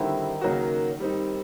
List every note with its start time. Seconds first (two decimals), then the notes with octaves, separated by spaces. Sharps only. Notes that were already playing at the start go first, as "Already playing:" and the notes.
Already playing: D3 D#3 G3 C4 E4
0.41 C#3 F#3 A#3 D#4 F#4
1.00 G3 C4 D#4